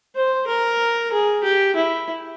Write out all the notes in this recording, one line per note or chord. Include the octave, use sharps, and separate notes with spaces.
C5
A#4
G#4
G4
E4